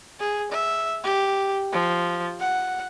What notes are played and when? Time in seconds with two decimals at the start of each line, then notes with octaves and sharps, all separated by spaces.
0.20 G#4
0.52 E5
1.04 G4
1.72 F3
2.40 F#5